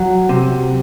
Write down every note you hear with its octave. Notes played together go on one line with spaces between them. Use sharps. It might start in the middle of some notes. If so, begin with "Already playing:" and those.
Already playing: F#3
C3